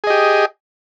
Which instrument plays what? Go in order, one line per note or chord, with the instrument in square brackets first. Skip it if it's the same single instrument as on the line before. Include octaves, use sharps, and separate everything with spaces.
[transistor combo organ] G#4
D#5
G4